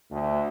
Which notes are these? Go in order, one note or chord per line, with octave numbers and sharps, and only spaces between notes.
D2